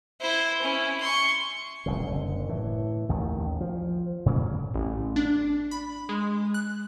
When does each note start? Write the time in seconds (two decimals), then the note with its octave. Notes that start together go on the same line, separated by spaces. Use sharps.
0.21 E4 C5
0.62 C#4 E4
1.01 C6 C#6
1.86 D#1 C2 C#3
2.03 F#1 D3
2.49 A2 E3
3.09 A1 D#2 D#3
3.60 F3
4.26 G#2 C#3 F#3 A#3
4.74 A1
5.16 D4
5.71 B5
6.09 G#3
6.54 F#6